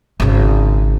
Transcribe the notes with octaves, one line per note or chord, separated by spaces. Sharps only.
G#1 C#3